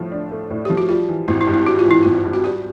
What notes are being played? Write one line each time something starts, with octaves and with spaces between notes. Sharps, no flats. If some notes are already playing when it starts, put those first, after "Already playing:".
Already playing: A2 F3 A3
D4
A3
A2
F3 G4
F#4
G3 F4
E3
G#1 E4
E4
G2
E4
G3 F#4
F4
E3
E4
G#1 F4
G2
F#4
G3 G4